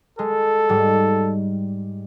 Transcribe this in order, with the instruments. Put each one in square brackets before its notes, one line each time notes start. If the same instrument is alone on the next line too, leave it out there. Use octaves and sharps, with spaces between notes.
[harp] G#3 [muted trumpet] A4
[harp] G#2 G3